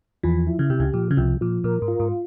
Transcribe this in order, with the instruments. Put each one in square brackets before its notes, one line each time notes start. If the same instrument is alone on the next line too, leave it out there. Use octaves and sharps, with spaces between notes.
[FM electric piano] E2 E3 [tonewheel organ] F3
[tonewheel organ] E4
[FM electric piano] C#3
[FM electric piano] C3 [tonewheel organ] G4
[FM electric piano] C#2 C#3
[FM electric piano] A#2 [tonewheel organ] F3
[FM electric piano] C#3
[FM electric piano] C2 C3 [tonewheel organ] F3
[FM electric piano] A#2 [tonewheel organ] F3
[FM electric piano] A#2 [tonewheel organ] A#4
[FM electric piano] G#2
[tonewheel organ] F4
[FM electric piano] G#2